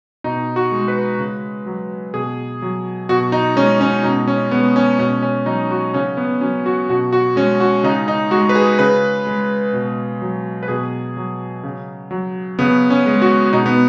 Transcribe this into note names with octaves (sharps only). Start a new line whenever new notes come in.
B2 D#4
F#4
G#3
B4
C#3
F#3
B2 G#4
F#3
B2 F#4
D#4
G#3 C#4
C#4
B2 D#4
C#4
G#3 B3
C#4
B2 C#4
C#4
F#3 D#4
F#4
C#3 C#4
B3
F#3 C#4
F#4
B2 F#4
F#4
G#3 C#4
F#4
C#3 D#4
D#4
G#3 F#4
B4
G#4
C#3 B4
G#3
B2
F#3
B4
B2 G#4
F#3
C#3
F#3
C#3 B3
C#4
G#3
F#4
B2 D#4
B3